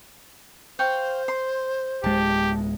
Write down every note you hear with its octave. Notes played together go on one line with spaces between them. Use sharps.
C5 F5 G5 C#6
C6
D1 G#3 G4 A5